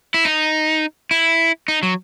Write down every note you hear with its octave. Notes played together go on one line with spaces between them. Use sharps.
E4
D#4
E4
D#4
F#3